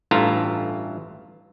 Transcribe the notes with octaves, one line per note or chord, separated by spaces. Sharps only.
A1 G2 A3 E4 F4 A#5